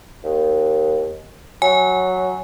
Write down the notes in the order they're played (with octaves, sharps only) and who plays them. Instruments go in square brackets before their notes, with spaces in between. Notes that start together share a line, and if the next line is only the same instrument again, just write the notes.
[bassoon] D#2
[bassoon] F#3 [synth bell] G#5